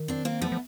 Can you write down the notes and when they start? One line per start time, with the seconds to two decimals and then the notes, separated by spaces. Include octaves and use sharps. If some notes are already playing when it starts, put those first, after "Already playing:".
Already playing: D#3
0.08 C4 D4
0.25 A#3 C4
0.41 F3 A3 B3
0.52 F3